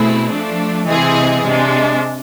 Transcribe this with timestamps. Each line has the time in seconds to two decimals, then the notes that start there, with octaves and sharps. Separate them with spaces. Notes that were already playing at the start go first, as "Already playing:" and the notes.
Already playing: B2 A3 C4 E4 G#4
0.30 F3 A3 D4
0.86 C3 E3 G#3 C4 G#4
1.42 C3 G#3 D4